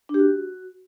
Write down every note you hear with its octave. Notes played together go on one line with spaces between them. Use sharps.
D4
G4
F#4